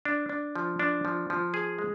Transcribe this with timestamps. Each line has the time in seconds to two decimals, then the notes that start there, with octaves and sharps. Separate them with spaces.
0.05 D4
0.29 D4
0.56 F3
0.79 D4
1.05 F3
1.30 F3
1.54 G#4
1.79 G#3